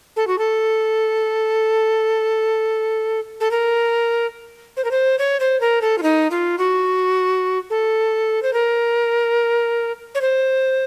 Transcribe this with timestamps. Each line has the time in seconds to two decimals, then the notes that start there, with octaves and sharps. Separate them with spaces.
0.16 A4
0.27 F#4
0.38 A4
3.40 A4
3.51 A#4
4.77 C5
4.84 A#4
4.91 C5
5.19 C#5
5.40 C5
5.61 A#4
5.82 A4
5.98 F4
6.03 D#4
6.31 F4
6.58 F#4
7.70 A4
8.42 C5
8.53 A#4
10.15 C#5
10.21 C5